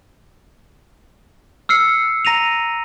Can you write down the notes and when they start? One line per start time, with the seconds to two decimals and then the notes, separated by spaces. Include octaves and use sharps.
1.69 E6 F6 C7 C#7
2.25 A#5 A#6 D#7 F7